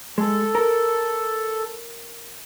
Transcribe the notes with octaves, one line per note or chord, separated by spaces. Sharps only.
G#3 A4
A#4